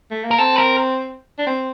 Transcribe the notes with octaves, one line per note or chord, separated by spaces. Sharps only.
A3
A#3
A#4
C4 A4
A#4
D4
C4